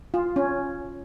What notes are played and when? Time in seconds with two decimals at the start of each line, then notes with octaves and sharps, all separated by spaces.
0.14 F4
0.36 C#4